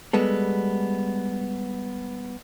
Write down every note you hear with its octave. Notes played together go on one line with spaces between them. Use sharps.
G3 G#3 B3 A4